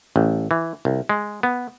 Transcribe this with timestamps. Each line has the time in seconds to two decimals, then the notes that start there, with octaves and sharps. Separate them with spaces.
0.16 A1
0.51 E3
0.85 C2
1.09 G#3
1.43 B3